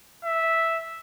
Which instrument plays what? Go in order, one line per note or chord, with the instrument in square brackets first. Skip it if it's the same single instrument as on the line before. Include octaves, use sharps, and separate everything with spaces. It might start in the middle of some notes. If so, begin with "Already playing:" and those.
[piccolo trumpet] E5